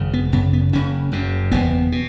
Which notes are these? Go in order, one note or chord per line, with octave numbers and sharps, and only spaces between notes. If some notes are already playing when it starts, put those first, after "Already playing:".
Already playing: G#1 F#2 C#3
B3
G#1 F#2 C#3 B3
B3
F#1 F#2 C#3 C#4
F#1 F#2 C#3
F#1 E2 B2 B3
B2